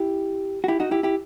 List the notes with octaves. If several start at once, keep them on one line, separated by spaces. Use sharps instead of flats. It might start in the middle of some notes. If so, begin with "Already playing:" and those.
Already playing: E4 G4
F#4
E4 G4
D#4 F#4
E4 G4
E4 G4